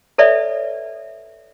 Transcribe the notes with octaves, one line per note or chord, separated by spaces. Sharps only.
A4 B4 C#5 D5 E5